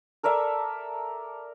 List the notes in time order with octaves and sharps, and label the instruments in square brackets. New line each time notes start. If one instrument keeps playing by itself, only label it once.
[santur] A4 A#4 D5 E5